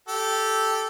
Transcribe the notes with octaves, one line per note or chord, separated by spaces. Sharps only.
G4 A4